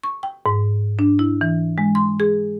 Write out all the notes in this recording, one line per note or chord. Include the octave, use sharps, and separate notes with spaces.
C#6
G5
G#2
D4
E4
E3
G#3
C6
G#4